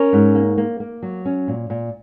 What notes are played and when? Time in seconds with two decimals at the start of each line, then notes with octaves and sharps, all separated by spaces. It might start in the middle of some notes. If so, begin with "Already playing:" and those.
Already playing: C#4 A#4 C#5
0.13 G#2
0.35 A#3
0.58 A#3
0.80 A#3
1.02 F#3
1.25 C#4
1.48 A#2
1.70 A#2